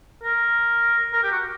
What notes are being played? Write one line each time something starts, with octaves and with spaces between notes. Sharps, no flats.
A#4
A#4
G4
F#4